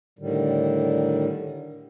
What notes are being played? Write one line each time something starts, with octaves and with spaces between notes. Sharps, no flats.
A2 D3 D#3 G3